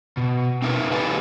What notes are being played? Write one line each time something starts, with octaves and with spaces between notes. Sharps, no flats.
B2
C4 D#4 E4 A#4 B4
D#4 G4 A4 B4 D#5 G#5